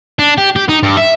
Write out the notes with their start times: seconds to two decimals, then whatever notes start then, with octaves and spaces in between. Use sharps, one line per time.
0.19 D4
0.38 G4
0.56 G4
0.69 D#4
0.83 G2
0.97 E5